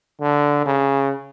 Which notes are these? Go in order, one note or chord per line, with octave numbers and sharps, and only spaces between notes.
D3
C#3